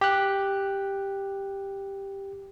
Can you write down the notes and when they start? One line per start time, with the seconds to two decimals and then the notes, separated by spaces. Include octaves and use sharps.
0.01 G4 F#6